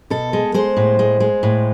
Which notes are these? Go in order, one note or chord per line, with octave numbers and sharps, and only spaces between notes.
B2 A4
G#3
G#3 C5
A2
G#3
G#3
A2